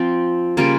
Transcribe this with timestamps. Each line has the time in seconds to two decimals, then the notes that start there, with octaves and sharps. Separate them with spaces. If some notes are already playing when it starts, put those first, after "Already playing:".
Already playing: F3 C4
0.57 C#3 G3 A#3 C#4 F4